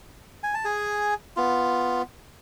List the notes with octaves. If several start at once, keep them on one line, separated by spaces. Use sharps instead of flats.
G#5
A5
G#4 G#5
B3 F4